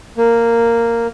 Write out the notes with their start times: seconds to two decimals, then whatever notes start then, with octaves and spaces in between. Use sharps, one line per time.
0.17 A#3